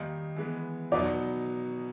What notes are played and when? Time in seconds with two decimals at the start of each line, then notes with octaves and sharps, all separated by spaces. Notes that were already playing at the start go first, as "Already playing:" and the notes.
Already playing: D#3 G3 A#3 D#4 D#5
0.36 E3 G#3 B3
0.92 B2 F#3 B3 D#4 D5